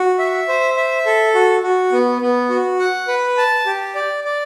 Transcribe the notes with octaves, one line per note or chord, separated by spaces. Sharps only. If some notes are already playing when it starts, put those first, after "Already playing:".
Already playing: F#4
E5
C5
E5
A4
F#4
F#4
B3
B3
F#4
F#5
B4
A5
G4
D5
D5